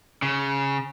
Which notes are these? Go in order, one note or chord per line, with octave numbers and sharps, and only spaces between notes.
C#3